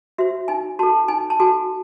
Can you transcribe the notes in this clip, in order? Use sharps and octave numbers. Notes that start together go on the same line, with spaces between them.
F#4 C5 E5
D#4 G#5
F#4 A4 A5
D#4 G#5
A5
F#4 A4 G#5